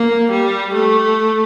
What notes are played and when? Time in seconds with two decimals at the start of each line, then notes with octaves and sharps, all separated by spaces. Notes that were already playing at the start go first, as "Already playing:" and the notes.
Already playing: A#3
0.30 G3
0.74 A3